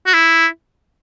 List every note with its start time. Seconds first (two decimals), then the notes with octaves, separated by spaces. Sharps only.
0.07 F#4
0.14 E4